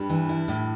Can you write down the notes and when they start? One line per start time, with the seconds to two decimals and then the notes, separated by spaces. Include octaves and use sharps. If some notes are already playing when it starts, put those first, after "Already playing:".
Already playing: G2 G3
0.09 E3
0.29 E4
0.48 A2